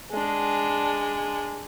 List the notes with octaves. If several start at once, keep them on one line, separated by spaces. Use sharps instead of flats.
G#3 D4